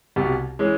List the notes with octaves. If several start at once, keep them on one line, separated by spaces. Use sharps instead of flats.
C2 B2 G3
E3 G#3 C#4